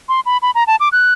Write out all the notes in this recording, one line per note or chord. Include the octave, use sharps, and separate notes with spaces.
C6
B5
B5
A#5
A5
D6
F#6